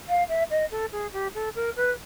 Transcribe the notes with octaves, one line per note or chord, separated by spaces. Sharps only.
F5
E5
D#5
A4
G#4
G4
A4
A#4
B4